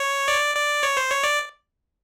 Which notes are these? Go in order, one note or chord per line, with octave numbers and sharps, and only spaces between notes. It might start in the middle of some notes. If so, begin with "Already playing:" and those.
Already playing: C#5
D5
D5
C#5
C5
C#5
D5